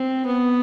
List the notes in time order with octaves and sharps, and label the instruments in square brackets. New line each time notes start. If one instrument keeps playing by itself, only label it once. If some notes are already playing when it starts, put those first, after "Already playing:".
Already playing: [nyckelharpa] C4
B3